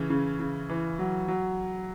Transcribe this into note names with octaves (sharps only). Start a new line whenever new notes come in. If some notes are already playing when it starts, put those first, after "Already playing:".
Already playing: C#3 E3
C#3
C#3
E3
F#3
F#3